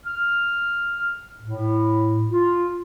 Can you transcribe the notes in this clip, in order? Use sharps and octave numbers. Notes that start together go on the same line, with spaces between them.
F6
A2
F4